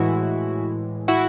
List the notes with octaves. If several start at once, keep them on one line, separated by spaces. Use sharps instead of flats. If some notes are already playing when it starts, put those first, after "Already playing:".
Already playing: A2 E3 G#3 E4 F#4
E4 F#4